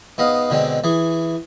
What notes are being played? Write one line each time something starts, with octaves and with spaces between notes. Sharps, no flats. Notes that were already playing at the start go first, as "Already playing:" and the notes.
G#2 B3 D#5 F5
B2 D3 G#3 C4
E3 G#4